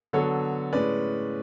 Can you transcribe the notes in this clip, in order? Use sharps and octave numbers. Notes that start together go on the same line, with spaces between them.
D3 F#3 B3 A4 C#5
A2 G#3 C#4 B4 D5